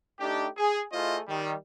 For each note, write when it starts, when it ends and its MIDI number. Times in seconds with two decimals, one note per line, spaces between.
0.20 0.48 57
0.20 0.48 62
0.20 0.48 63
0.20 0.48 67
0.57 0.82 68
0.93 1.20 57
0.93 1.20 64
0.93 1.20 65
0.93 1.20 68
0.93 1.20 72
0.93 1.20 75
1.28 1.54 51
1.28 1.54 55